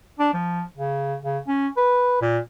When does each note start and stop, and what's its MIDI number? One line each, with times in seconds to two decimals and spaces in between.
0.19 0.30 62
0.33 0.63 53
0.77 1.16 49
1.23 1.39 49
1.48 1.68 61
1.77 2.21 71
2.21 2.39 46